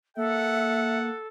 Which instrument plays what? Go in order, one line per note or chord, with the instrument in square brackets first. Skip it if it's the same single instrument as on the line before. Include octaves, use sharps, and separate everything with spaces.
[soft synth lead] A#3 [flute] A4 [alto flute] E5 [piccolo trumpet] F#5